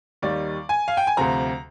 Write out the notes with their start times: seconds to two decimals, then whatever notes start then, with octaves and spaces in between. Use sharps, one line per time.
0.22 D#2 D#3 G3 D5
0.69 G#5
0.88 F5
0.97 G5
1.07 G#5
1.17 D2 C3 F3 C4 A#5